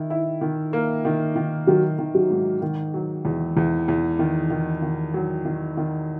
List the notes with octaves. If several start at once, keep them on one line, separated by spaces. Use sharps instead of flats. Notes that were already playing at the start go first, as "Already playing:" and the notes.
Already playing: D#3 E4
E4
D#3
A#3
D#3
D#3
D#3 F#3
D#3
F#3
G#2
D#3
F#3
E2
E2 E3
E2
D#3
D#3
D#3
F#3
D#3
D#3